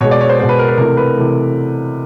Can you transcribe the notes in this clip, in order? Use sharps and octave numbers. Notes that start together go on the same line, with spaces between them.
B2 G#3 C#5
D5
C#5
C5
B2 G#3 C5
B4
A#4
B4
C3 E3 A3 A#4
B4
C3 E3 A3